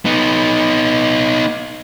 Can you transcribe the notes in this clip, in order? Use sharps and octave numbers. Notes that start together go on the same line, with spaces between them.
B3 D#4